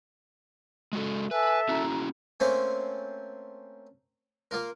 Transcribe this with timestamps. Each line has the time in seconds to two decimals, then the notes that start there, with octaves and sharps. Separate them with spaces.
0.93 G#3 F#4 A4
1.31 A4 B4 E5 G#5
1.69 C#4 E4 F#4 A#5
2.40 A3 A#3 C4 C#4 C5
4.51 A#3 F4 A#4